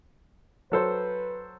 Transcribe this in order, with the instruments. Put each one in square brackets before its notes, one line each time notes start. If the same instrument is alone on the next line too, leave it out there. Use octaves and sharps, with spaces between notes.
[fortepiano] F#3 A4 C5 [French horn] B4